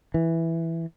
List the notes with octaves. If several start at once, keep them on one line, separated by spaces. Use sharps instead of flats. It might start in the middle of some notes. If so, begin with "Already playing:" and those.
E3